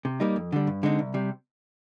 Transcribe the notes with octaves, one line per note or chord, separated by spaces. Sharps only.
C3
G3 A#3 D#4
F2
D3 G3
G2
D3 G#3 C4 D#4
C2
C3 G3